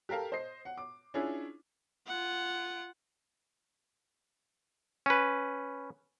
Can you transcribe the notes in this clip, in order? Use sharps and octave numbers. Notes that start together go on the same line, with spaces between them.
G4 A4 A#4 F5 A5
C5 D#5 C7
F#5
D6
C#4 D4 E4 F4 G#4
F4 F#5
C#4 B4